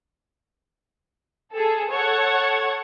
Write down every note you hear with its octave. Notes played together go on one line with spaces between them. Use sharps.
G#4 A4
A4 C#5 F#5 C#6 G#6